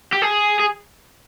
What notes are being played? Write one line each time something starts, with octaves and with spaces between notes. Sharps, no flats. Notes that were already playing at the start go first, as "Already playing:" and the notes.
G4
G#4
G#4